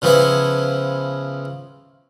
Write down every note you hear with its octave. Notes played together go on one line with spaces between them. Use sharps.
C#3 F3 B3 E4 G#5